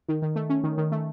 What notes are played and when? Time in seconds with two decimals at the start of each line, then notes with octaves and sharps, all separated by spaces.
0.09 D#3
0.22 D#3
0.36 A3
0.50 C#4
0.64 D#3
0.78 D#3
0.92 A3